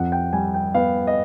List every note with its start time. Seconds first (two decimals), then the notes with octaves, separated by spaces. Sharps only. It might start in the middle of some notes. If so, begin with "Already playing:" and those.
Already playing: F2 F#5
0.12 G5
0.33 G3 G#5
0.54 G5
0.75 B3 F5
1.07 D#5